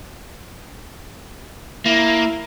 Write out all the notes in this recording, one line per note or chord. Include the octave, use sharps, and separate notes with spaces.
A#3 E4